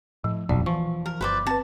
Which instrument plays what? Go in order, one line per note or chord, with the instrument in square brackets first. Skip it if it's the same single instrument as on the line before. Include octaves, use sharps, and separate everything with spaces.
[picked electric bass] A2 [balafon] F3
[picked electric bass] D#1 F2 [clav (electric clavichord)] B1 [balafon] D5
[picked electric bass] E3 [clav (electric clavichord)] F3 [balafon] C#6
[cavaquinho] A#4
[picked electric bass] G1 [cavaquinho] B4 C5 D5
[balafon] C4 B4 [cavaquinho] A5